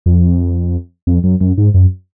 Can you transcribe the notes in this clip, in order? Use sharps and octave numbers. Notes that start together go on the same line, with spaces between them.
F2
F2
F#2
F#2
G#2
F#2